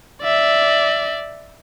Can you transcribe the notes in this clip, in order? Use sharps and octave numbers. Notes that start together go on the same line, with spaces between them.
D5 E5